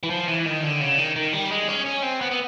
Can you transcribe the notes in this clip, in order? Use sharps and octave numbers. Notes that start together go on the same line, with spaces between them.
E3
F3
E3
D#3
D3
C#3
D#3
D#3
G3
G#3
C#4
C#4
C4
B3
B3